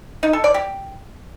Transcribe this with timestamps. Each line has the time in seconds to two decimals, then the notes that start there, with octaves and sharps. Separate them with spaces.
0.23 D#4
0.33 A4
0.44 D5
0.54 G4